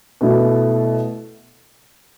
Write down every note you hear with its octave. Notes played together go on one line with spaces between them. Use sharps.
B2 A3 E4